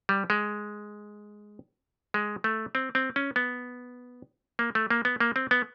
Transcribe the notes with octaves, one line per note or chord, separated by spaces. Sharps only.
G3
G#3
G#3
A3
C4
C4
C#4
B3
A#3
A3
A#3
B3
A#3
C4
B3